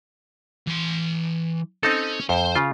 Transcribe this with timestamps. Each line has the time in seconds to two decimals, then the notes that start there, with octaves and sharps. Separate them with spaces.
0.67 E3 C6
1.83 C4 C#4 D#4 A4
2.29 F2 C5
2.56 C#3 F4